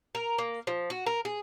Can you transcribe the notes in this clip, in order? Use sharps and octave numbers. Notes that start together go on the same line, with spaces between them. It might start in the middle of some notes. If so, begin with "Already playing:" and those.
A#4
A#3
F3
F#4
A#4
G#4